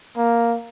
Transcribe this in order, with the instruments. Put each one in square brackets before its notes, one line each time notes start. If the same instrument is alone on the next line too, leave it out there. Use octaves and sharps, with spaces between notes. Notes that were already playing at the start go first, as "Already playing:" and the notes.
[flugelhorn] A#3